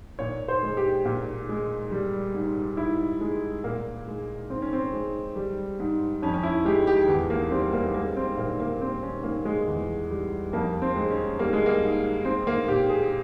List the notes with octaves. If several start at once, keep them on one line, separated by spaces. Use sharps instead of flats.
A#2 C#5
C5
G#3
G4
A#2
G#3
G3
G#2
G#2 E4
G#3
A#2 A#3
G#3
G#2 C4
C#4
C4
G#3
G3
G#2
F2 C#4
C#4
E4
G#3 G4
G4
E2
A#3
G3 C4
A#3
G#3 A#3
C4
A#2 A#3
A#3
G3 C4
C#4
G#2 A#3
G#3
E2
G3
F2 A#3
C4
G#3
C#4
G3 A#3
G#3
A#3
G#2
G#3 C4
A#3
A#2 G4
G#4